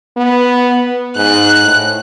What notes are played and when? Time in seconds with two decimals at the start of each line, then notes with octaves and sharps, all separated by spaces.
0.17 B3
1.16 G#2 F#6
1.63 A2